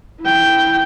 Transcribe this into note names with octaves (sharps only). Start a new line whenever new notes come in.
E4 G5